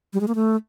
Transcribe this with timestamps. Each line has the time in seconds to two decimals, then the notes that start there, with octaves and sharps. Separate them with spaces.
0.13 G3
0.21 G#3
0.28 A#3
0.35 A3